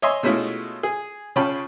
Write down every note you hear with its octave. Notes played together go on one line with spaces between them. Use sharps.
C#5 D#5 E5 G#5 C6
B2 G#3 A3 C#4 E4 F4
G#4
C#3 C#4 F4 G5 A5 B5